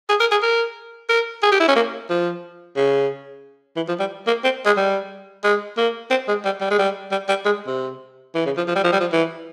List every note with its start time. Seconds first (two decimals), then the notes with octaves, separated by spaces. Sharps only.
0.09 G#4
0.20 A#4
0.31 G#4
0.42 A#4
1.09 A#4
1.43 G#4
1.51 G4
1.60 E4
1.68 C#4
1.76 A#3
2.10 F3
2.76 C#3
3.76 E3
3.88 F3
4.00 G3
4.27 A#3
4.44 C4
4.66 G#3
4.77 G3
5.44 G#3
5.77 A#3
6.11 C4
6.28 G#3
6.45 G3
6.61 G3
6.71 G#3
6.79 G3
7.11 G3
7.29 G3
7.45 G#3
7.67 C3
8.35 E3
8.46 C#3
8.57 F3
8.68 F3
8.76 G3
8.84 F3
8.92 G3
9.01 F3
9.12 E3